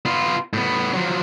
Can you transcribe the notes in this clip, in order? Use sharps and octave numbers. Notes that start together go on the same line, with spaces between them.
B3 F4
A2 B3
F3 F#3